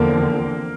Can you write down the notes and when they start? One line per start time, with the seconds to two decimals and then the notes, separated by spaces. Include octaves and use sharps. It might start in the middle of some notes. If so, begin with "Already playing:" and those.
Already playing: E2 D3 F3 A#3 C4 A#4